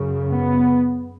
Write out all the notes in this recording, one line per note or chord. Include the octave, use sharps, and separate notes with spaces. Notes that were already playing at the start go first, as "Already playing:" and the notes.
Already playing: F#2 C#3
B3